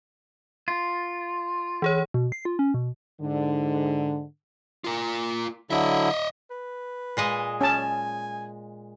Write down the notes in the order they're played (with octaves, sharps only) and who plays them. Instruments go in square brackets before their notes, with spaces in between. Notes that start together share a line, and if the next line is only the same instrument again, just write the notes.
[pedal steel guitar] F4
[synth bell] E3 G#4 C#5
[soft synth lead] B2
C7
F4
C#4
B2
[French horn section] G#2 D3
[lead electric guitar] F4 A#4
[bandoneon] D3 F#3 E4 [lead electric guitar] D#5 E5
[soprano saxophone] B4
[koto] A#2 G#3 D#5
[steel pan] C#4 A5 [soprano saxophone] G#5